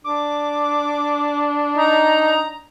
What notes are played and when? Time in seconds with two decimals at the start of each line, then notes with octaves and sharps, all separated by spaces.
0.04 D4 D6
1.77 D#4 A#5